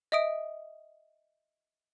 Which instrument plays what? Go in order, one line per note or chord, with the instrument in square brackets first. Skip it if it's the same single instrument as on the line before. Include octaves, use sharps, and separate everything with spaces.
[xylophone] D#5 E5 D#6 D7